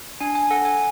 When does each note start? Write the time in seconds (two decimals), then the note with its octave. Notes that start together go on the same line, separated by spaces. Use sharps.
0.20 D4 G#5
0.35 G#5
0.51 A4 F#5
0.65 G#5